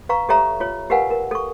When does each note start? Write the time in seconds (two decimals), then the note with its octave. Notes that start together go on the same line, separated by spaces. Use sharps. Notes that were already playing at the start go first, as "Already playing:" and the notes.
0.09 B4 F5 A#5 C#6
0.29 G4 A4 C#5 E5 A#5
0.60 F4 C#5
0.90 G4 A#4 B4 F5 F#5 G#5
1.10 A#4
1.31 A4 C#6